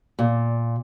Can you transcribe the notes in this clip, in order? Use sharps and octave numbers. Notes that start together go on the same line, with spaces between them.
A#2